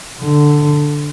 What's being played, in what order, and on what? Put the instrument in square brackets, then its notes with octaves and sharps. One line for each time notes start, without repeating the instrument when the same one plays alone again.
[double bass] D3